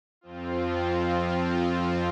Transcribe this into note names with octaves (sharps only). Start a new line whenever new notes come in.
F2 F3 C4 F4